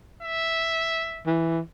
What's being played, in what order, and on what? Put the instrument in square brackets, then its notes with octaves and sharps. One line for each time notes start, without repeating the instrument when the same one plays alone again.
[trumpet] E5
[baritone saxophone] E3